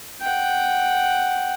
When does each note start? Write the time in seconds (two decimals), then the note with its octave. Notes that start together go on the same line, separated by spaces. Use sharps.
0.21 F#5 G5